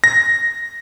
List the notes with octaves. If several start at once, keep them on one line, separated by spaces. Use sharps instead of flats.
A#6